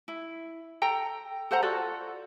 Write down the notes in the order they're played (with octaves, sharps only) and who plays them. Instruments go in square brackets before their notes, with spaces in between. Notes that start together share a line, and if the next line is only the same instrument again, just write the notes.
[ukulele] E4
A4 G5 A#5
A4 C5 F#5 A#5
F4 F#4 A4 D5